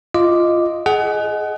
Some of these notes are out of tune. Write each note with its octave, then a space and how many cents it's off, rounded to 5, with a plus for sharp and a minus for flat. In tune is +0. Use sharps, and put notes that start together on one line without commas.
F4 -10 D#5 +0 D6 +0
G#4 +25 D#5 +0 F#5 +25